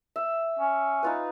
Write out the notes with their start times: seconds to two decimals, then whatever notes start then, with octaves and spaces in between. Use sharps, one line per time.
0.16 E5
0.59 C#4
1.03 D#4 F4 B4